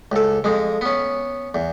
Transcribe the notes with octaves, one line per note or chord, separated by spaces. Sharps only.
C#2 A4
F2 G#3
B3 C#4
E2